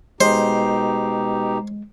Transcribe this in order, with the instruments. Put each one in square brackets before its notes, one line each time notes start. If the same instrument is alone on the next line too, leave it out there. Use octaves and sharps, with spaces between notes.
[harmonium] B2 D#4 G4 [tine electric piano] G#3 [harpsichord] C5